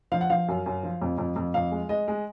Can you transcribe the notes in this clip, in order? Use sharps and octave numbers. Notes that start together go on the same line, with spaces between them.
F3 F5
F#5
F3 F5
F#2
F#2
F3
F2
F2
F2
F2 F5
G#3
G#3 D#5
G#3